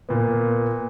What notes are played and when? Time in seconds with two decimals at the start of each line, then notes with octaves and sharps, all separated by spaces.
0.09 A#2 B3